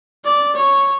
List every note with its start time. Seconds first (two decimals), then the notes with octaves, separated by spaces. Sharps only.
0.25 D5
0.56 C#5